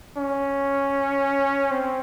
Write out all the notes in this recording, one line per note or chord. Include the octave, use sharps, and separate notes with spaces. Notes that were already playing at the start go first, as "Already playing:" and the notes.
C#4
C4